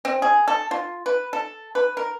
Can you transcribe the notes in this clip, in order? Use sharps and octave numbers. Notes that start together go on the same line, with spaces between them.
C4
G#4
A4
F4
B4
A4
B4
A#4